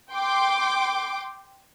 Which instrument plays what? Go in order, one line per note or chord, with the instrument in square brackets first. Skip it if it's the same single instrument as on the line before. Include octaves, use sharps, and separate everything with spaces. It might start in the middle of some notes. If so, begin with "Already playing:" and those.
[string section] G5 C6 D6